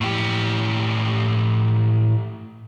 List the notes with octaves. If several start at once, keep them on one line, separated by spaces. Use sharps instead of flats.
A2 G4